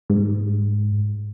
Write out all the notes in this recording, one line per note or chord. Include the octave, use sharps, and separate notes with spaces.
G#2